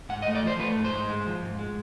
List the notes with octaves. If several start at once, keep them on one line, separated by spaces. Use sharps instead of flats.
G#2 F#5
D#5
A3
D5
F3 C5
A3 B4
G#2
C5
G#2
G#3
F3
G#2
G#3